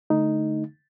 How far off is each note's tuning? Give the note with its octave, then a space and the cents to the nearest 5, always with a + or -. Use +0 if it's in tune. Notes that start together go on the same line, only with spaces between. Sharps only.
D3 -5 A3 -15 D#4 +0